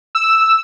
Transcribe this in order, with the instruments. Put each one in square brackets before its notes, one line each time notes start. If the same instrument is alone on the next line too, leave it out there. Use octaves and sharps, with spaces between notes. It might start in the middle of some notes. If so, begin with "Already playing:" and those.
[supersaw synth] E6